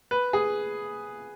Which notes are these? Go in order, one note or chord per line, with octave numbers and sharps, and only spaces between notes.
B4
G#4